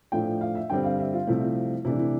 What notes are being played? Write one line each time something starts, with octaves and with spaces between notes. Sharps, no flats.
A2 F3 A3 D4 G5
F5
E5
G2 D3 G3 C4 G5
F5
E5
F4
C2 C3 F3 A3 C4 E4
C3 E3 A3 D4 E4
E4